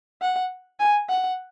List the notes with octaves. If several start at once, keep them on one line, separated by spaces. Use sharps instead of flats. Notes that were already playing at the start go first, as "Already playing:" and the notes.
F#5
G#5
F#5